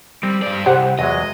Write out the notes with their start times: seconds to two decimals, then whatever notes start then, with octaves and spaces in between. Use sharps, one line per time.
0.23 G3 C4 A#4
0.42 G2 D5
0.66 C2 G4 C5 F#5
0.99 E2 F#3 G#3 D#5